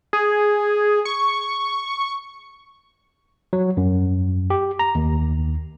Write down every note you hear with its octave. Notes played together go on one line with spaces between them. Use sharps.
G#4
C#6
F#3
F#2
G4
A#5
D#2